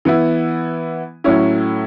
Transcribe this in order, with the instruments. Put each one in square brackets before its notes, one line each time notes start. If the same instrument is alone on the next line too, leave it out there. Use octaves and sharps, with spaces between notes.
[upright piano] E3 B3 E4
A2 F#3 C#4 E4